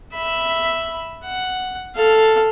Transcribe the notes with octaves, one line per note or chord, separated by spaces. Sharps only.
E5 B5
F#5
A4 F5